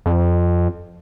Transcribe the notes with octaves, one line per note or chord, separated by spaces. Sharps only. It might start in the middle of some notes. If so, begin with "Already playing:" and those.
F2